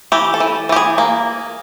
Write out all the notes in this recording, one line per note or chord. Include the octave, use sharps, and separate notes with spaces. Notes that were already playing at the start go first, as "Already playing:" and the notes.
E3 G4
A4
E3
E3 G4
G#4
A#3